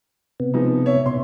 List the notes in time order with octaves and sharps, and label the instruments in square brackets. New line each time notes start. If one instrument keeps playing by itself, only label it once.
[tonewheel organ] C3 B3
[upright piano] F3 G#3 D#4
C#5 E5
[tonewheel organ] B2 [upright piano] C6